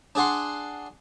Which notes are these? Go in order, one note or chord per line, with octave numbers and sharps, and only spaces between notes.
D4 G#4 F#5 C6